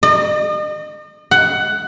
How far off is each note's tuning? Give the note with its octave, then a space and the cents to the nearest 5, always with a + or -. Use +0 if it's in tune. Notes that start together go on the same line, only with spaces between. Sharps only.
D#5 -40
F#5 +15